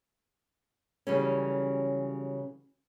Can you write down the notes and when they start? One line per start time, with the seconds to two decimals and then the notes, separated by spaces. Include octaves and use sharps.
1.07 C#3 E3 F#3 G3 A3 C#4